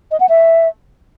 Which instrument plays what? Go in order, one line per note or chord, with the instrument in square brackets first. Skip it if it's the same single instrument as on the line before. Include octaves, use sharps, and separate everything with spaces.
[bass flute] D#5
F#5
E5